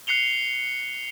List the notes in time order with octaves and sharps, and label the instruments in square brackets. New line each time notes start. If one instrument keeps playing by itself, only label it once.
[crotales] F#6 C7 C#7 F7 G7